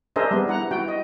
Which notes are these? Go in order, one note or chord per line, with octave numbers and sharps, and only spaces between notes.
D4 G#4 A#4 C5 D#5 E5
G3 B3
E4 F#5 A#5
E4 F#4 G5
D#5